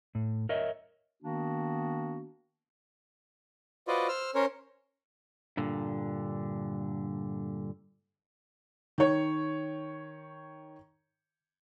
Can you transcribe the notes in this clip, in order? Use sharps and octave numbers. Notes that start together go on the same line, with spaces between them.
A2
A#4 C#5 D#5 E5
D#3 A#3 B3 D4 F#4
F4 F#4 B4 C5 D5 D#5
C5 E6 F6
C#4 A#4 C5 C#5
G2 A#2 D3
D#3 C#5